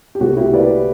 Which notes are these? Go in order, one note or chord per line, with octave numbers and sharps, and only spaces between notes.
G4
C2 B2 A3 F#4
E4 G4
B4 D5